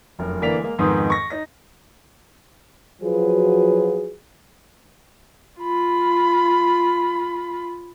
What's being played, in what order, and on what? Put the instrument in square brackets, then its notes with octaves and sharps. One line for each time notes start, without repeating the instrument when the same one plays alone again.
[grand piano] F1 F#2 A#4
D3 E3 A#3 D5 B6 F7
G#3 A#3
F2 G#2 D#3 B3 C6 D#6
C#6 A#6
D#4 A#6
[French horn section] F3 F#3 F4 F#4 G#4 B4
[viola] F4 B5